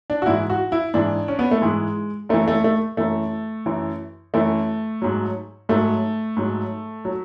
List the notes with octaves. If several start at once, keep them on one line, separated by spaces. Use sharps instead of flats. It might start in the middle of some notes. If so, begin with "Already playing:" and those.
D4
F#4
G#2 E3 E4
F#4
E4
G#2 E3 D4
C#4
B3
A3
G#2 E3 G#3
F#2 E3 A3
A3
A3
F#2 E3 A3
F#2 E3
F#2 E3 A3
G#2 F#3
G#2 F#3 A3
G#2 F#3
F#3